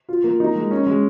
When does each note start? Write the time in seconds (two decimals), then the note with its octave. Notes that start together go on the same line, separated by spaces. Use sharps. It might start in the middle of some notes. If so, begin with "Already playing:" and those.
0.09 F4
0.24 A#3
0.40 D#4
0.55 G#3
0.71 C#4
0.86 G#3